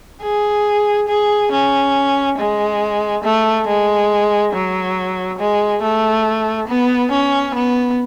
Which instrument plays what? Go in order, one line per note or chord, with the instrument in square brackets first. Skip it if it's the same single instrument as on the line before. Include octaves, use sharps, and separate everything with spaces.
[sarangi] G#4
G#4
C#4
G#3
A3
G#3
F#3
G#3
A3
B3
C#4
B3